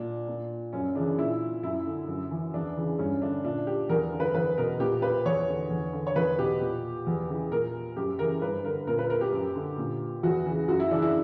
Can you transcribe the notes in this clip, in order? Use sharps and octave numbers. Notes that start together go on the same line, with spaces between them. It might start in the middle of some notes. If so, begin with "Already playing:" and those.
Already playing: A#2 D4
A#2
F#2 C#4
C#3 E3 D4
A#2 E4
F#2 E4
D3
F#2
E3
E2 D4
C#3 E3
G2 C#4
D3 D4
A#2 D4
G4
E2 A#4
D3
B4
E2 B4
B2 A#4
A#2 G4
B4
E2 C#5
D3
E2
D3
C#5
E2 B4
B2 G4
A#2
E2
C#3 E3
A#2 A#4
F#2 G4
C#3 E3 A#4
G2 B4
D3 A#4
A#2 A#4
B4
A#4
G4
F#2
D3
A#2
E2 F#4
C#3 E3
F#2 F#4
E4
C#3 E3 D4
E4